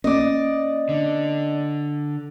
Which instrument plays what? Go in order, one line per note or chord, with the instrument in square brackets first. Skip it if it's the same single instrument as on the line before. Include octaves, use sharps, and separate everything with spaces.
[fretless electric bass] A#3 C#4 [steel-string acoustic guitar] D5 D#5
[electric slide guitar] D3